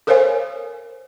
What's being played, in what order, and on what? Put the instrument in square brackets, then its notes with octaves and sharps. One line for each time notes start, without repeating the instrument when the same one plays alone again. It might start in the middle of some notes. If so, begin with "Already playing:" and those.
[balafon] A4 A#4 C5 C#5 F5 G#5